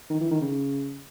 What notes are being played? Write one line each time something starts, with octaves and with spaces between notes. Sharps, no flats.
D#3
E3
D#3
C#3